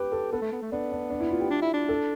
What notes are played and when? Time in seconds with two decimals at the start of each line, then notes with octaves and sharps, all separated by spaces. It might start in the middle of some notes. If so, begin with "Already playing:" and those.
Already playing: G4 B4
0.12 A4
0.32 B3 A4
0.42 A3
0.52 B3
0.62 A3
0.72 B3 D4
0.92 D4
1.10 D4
1.20 E4
1.31 F4
1.40 G4
1.50 D4
1.62 E4
1.73 D4
1.89 A4